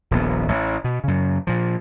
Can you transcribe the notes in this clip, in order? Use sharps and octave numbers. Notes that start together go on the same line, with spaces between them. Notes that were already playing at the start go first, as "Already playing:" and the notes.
D#1 A#1 B3
A1 A2
B2
F#2 C#3
A#2 F3